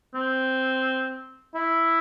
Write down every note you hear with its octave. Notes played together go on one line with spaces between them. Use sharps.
C4
E4